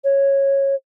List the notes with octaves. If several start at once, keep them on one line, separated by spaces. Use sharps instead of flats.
C#5